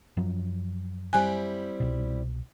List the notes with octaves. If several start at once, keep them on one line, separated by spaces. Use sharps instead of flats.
F#2 F3 F#3
G3 C4 E4 G#5 F#6
C2 B2